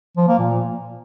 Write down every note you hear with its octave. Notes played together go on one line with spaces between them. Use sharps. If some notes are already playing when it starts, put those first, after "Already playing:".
F3
A#3
A#2